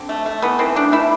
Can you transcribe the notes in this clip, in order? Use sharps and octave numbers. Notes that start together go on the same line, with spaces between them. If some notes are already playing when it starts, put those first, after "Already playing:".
Already playing: D3 C4
A3
A3
E3 B3
E3 C4
A3 D4
A3 E4